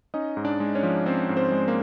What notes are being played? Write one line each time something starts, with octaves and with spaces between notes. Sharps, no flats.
C#4 D#4 D#5
G#2
D4 D5
G#3
C#4 C#5
F3
C4 C#4 C5
G#2
C4 C5
G#3
A#3